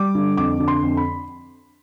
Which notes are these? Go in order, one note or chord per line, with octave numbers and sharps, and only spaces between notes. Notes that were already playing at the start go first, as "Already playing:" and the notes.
Already playing: G3 D6
D3
F2 D6
D3
C6
F2
B5